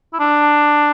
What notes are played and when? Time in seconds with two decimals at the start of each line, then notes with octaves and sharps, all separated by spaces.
0.13 E4
0.20 D4